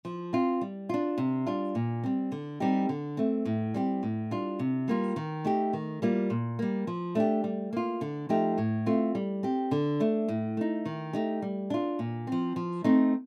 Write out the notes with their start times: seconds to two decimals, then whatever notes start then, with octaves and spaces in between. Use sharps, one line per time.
0.05 F3
0.33 C4 F4
0.61 G3
0.89 D4 F4
1.18 C3
1.46 G3 D4 F4
1.75 A#2
2.04 G3 C4
2.32 D3
2.60 G3 C4 D#4 G4
2.89 D3
3.17 A3 C4
3.45 A2
3.74 G3 C4 G4
4.03 A2
4.31 G3 D4 F4
4.59 C3
4.88 G3 A#3 F4
5.16 D#3
5.45 A3 D#4 G4
5.73 D#3
6.02 G3 A#3 F4
6.30 A#2
6.59 G3 A#3
6.87 F3
7.15 A3 D4 G4
7.44 G3
7.73 A#3 F4
8.01 D3
8.29 F3 A3 D#4 G4
8.58 A2
8.86 A3 C4 F4
9.15 G3
9.43 C4 G4
9.71 D3
10.00 A3 D4
10.28 A2
10.57 A3 D#4
10.85 D#3
11.13 A3 D#4 G4
11.42 G3
11.70 D4 F4
11.99 A#2
12.27 F3 C4
12.56 F3
12.84 A3 C4 D#4